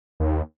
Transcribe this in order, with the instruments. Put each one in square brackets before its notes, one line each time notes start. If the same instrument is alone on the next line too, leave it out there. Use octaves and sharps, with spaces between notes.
[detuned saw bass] D#2